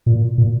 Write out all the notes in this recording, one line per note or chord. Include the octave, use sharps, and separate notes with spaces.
A#2
A#2